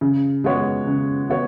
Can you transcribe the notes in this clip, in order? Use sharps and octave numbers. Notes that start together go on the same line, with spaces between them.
C#3
G#3 B3 F#4 C#5
C#3
G#3 B3 F#4 C#5